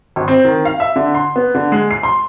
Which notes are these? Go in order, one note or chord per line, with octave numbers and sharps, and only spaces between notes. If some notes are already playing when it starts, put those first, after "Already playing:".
G#1
C4
D#3
F5
E5
D3
C6
B3
D3
G#3
C7
C6